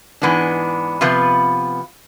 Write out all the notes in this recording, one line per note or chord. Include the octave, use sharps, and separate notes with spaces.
G#2 E3 G#3 B3 D4
C3 F3 B3 F4 B4